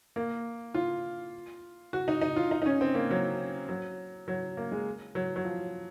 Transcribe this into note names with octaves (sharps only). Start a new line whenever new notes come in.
A#3
F4
F#4
D#4
D#4
F4
D#4
D#4
C#4
C4
A#3
F#3
F#3
F#3
A#3
G#3
F#3
F#3
F3